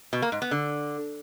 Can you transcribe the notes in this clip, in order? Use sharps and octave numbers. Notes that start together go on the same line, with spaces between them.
B2
A#3
G#2
B3
D3